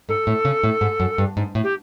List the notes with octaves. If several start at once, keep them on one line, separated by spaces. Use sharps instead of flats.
G#2 A4
A2
C#3
A2
G#2
F#2
G2
G#2
A2
G4